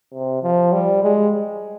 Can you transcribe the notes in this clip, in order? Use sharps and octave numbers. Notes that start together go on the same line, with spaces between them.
C3
F3
G3
G#3